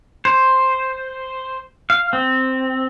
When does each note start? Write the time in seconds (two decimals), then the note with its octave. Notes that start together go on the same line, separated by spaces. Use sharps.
0.25 C5
1.90 F5
2.13 C4